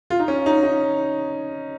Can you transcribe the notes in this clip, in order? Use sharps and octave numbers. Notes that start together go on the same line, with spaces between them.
F4
D#4
C#4
D#4
D#4